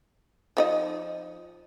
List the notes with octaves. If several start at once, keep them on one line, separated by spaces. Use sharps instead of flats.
F3 D#4 D#5